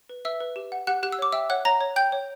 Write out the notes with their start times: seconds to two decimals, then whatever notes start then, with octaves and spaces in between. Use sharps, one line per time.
0.10 B4
0.25 B4 E5 E6
0.40 B4
0.56 G4
0.72 F#5
0.87 G4 F#5 F#6
1.03 G4 F#6
1.12 E6
1.19 C#5 D6
1.32 E5 G5 E6
1.50 C#5 F#5 F#6
1.65 C#5 A#5 A#6
1.81 C#5
1.96 G5 G6
2.12 C#5